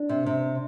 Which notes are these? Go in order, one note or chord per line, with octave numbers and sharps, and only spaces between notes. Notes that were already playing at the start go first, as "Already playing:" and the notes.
Already playing: D4
C3
C3